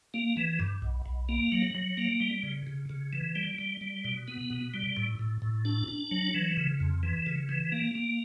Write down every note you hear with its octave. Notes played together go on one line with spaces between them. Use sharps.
A#3
E3
G2
B1
B1
A#3
F#3
F#3
A#3
G3
C#3
C#3
C#3
E3
G3
G3
G3
B2
B3
B2
G3
A2
A2
A2
D4
D4
F#3
E3
C#3
F2
E3
C#3
E3
A#3
A#3